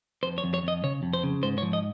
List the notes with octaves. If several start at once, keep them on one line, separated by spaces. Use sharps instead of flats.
F2 C5
C#5
F2
C#5
F2 D#5
C#3 C#5
F2
C5
C#3
G#2 C5
C#5
F3
D#5